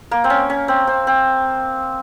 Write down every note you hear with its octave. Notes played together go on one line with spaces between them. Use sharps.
A#3
C4
C#4
C#4
C4
C4
C4